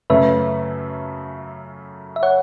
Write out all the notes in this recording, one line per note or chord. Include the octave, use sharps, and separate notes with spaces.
F#2 C#3 A3 C#4 B4 E5
E5
C#5 F#5